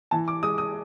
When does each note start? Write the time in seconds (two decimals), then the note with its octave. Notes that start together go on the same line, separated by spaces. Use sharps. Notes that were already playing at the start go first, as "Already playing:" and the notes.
0.11 E3 A5
0.28 D6
0.43 G#3 D#6
0.58 D#6